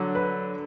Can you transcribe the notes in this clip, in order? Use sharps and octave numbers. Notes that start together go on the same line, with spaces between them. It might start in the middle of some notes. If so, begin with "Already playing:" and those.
Already playing: D3 F#3
B4